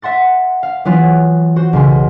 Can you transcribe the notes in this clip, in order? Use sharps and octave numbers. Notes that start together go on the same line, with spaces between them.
E5 F#5 C6 A6
F5
E3 F#3 B3 F4
F#4 C5
B1 C#3 C6